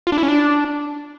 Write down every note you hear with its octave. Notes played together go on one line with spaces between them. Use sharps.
F4
D4
E4
C#4
D4